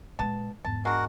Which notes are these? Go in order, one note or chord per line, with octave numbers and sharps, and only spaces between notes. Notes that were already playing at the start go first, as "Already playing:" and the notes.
A#2 G#3 B3 A5
E2 G#2 A5
G#3 D4 F#4 A#4 F#5